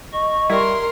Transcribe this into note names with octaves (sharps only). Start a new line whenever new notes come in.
D#5 C#6
G3 E4 A#4 C6